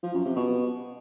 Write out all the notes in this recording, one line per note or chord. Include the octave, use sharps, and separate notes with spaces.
F3
F#2
C3
B2